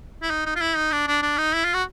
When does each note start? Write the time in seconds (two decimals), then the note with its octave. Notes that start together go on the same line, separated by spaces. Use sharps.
0.22 E4
0.30 D#4
0.46 D#4
0.56 F4
0.61 E4
0.76 D#4
0.92 D4
1.07 D4
1.22 D4
1.38 D#4
1.54 E4
1.64 F4
1.74 F#4